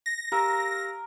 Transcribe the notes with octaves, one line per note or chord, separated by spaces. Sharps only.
A#6
G4 A#4 F5 E6